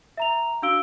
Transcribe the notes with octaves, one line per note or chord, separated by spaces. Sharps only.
E5 A#5 F7
D4 F#4 F5 E6 D7 G7